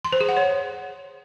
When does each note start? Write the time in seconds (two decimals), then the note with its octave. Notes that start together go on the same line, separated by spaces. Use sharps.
0.04 C6
0.13 C5
0.21 G#4
0.29 F#5
0.37 C#5